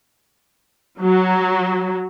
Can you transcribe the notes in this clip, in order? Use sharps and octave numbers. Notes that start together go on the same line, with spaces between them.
F#3